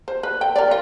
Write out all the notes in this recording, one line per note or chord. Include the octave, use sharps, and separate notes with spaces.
C5
B4
A4 G5
A#4 D5
E3 F4